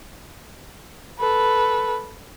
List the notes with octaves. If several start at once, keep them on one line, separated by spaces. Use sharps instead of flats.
A4 B4